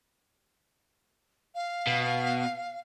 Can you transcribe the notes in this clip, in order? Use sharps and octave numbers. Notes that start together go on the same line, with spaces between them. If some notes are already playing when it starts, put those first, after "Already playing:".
F5
B2